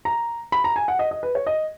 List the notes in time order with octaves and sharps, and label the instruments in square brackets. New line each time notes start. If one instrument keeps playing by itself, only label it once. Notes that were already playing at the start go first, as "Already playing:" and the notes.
[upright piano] A#5
B5
A#5
G#5
F#5
D#5
D#5
B4
C#5
D#5